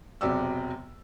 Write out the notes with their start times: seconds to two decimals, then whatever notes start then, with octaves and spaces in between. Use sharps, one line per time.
0.21 E1 C3 F#3 G4 D5 E6